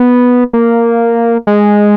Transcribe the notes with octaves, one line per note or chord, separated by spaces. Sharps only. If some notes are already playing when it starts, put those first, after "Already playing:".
Already playing: B3
A#3
G#3